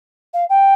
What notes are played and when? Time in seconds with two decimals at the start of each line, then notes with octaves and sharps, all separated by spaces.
0.34 F5
0.49 G5